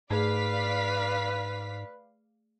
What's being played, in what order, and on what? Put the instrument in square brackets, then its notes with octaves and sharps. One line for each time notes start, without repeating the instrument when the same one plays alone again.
[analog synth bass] G#2 [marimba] A3 G#4 [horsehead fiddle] B4 [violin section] D5 F5 B6